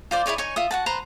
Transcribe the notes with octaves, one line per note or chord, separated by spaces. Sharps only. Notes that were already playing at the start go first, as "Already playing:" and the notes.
F4 C5 D5
E4 G#4 C#5 D5
D#4 C#5 G#5 C#6
F4 E5 D#6
F#4 F#5 A5
B4 C5 A#5 C6